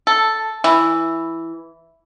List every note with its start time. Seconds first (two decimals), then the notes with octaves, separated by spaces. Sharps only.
0.07 A4
0.64 E3